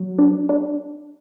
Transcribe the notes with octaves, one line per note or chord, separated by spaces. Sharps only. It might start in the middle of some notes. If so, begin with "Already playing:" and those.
Already playing: F#3
D4
D4